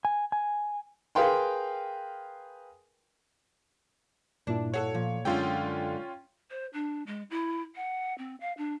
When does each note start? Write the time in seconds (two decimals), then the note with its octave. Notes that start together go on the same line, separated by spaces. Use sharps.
0.05 G#5
0.32 G#5
1.15 G#4 A#4 B4 F5 G5 C6
4.47 G2 A#2 D4 E4
4.74 F#4 G#4 A4 C#5
4.94 A#2 F3
5.25 F#2 D3 G#3 C#4 D4 F4 G5
6.51 C5
6.73 D4
7.07 G#3
7.30 E4
7.76 F#5
8.18 C4
8.41 F5
8.58 D4